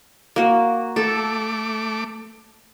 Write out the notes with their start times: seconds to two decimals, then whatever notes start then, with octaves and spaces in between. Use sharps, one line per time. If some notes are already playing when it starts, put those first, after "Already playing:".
0.36 A#3 F#4
0.96 A3 A4 D6